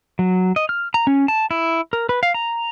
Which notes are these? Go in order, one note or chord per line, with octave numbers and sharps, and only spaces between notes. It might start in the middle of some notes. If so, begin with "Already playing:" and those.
F#3
D#5
F6
A#5
C#4
A5
E4
A#4
B4
F5
A#5